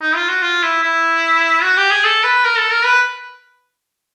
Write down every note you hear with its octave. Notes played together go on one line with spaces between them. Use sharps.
D#4
F4
F#4
F4
E4
E4
F#4
G4
G#4
A4
B4
A#4
A4
A#4
B4